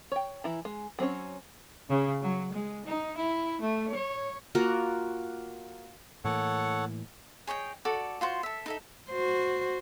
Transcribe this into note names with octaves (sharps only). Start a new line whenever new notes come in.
C#5 G5
E3 E4 A#5
G#3
F#3 C4 C#4 C#5
C#3
F#3
G#3
D#4
E4
A3
C#5
A#3 F4 F#4 A#4
A2 E3 A#3 A4 C#5 F#5
G#4 C#5 D#5 G5
F#4 A4 D5 D6
F4 F#4 C5
A4 E5
D#4 A4 E5
F#4 C5